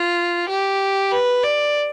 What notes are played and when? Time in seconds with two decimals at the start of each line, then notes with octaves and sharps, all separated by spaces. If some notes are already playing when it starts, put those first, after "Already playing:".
Already playing: F4
0.48 G4
1.12 B4
1.43 D5